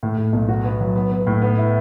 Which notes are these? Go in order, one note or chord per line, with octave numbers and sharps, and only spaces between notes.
A2
A2
B1
F#4
B3
F#3
B3
B3
A2
B3
E4